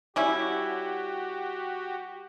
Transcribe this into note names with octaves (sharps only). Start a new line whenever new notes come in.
G3 C#4 E4 F#4 G4